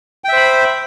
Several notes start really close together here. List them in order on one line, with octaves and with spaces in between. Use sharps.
G5 E5 C5 B5